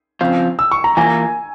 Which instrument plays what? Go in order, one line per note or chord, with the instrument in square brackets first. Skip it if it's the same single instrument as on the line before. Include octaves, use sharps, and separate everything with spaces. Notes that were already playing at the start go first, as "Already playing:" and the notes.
[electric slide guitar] C#3 F3 C4 F4
[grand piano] E6
C#6
A#5
[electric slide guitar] E3 A#3 F4 A#4 [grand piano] G#5